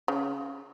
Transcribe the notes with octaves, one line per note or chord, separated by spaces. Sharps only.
C#3